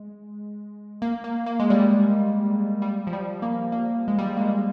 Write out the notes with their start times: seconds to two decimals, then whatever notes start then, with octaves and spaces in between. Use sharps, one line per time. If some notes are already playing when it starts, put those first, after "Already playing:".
Already playing: G#3
1.02 A#3
1.24 A#3
1.46 A#3
1.60 G#3
1.70 G3
2.82 G3
3.07 F3
3.13 G3
3.42 A#3
3.72 A#3
4.08 G#3
4.18 G3
4.37 A#3
4.41 G#3